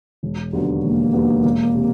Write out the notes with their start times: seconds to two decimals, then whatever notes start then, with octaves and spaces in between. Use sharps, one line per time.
0.23 E1
0.53 D#2 D3 F#3 B3
0.84 E1 A#3
1.13 D#2 D3 F#3 B3
1.44 E1
1.75 C3